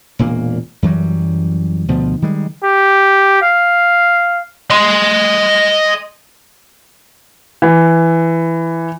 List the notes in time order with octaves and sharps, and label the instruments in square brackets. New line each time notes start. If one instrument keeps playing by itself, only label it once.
[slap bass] E1 A#2 A#3
F#2 E3 F#3 G3
D2 B2 F3
D#3 G3 G#3
[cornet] G4
F5
[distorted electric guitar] D#5 C6
[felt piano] E3